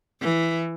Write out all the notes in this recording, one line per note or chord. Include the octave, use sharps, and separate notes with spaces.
E3